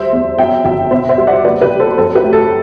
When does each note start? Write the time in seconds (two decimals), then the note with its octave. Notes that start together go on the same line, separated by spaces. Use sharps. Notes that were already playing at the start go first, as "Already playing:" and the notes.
Already playing: D2 G3 C5 E5
0.13 E2
0.38 F#2 E5 G5
0.65 G1 E5 G5
0.91 B2 C5 E5
1.09 C5 E5
1.18 G3
1.27 D5 F#5
1.44 F#1 B4 D5
1.61 G4 B4
1.71 G3
1.80 A4 C5
1.97 F#2 A4 C5
2.15 G4 B4
2.24 A3
2.32 F#4 A4